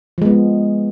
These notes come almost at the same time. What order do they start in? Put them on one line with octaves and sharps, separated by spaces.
F3 G#3 B3